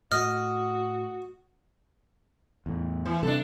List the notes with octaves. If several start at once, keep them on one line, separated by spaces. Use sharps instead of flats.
A2 F#4 D#5 F6
E2 A2
E3
C3 G3 D4 A4